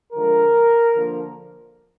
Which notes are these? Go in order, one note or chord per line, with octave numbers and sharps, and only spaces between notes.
D3 F3 G#3 A#4
D3 F3 A#3